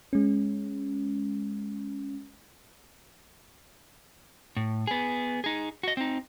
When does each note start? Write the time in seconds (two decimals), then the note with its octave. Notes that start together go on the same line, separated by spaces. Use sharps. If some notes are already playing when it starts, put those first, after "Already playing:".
0.13 G#3 C#4
4.56 A2
4.87 B3 G#4
5.44 D#4 G#4
5.83 F#4 D#5
5.97 C4 D#4